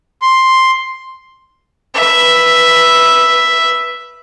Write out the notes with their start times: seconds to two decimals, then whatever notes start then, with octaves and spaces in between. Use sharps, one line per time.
0.22 C6
1.94 B4 E5